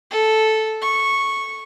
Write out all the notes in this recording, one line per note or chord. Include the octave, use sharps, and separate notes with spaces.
A4
C#6